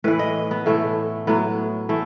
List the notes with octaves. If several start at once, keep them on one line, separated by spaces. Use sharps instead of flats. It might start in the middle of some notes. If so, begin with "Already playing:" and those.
A2 E3 B4
D#5
B3
A2 E3 A3
A2 F#3 B3
E3 A3